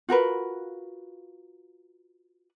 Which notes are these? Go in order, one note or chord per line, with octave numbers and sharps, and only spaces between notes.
F4 F#4 A#4 B4